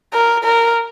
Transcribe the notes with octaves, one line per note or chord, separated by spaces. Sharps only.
A#4
A#4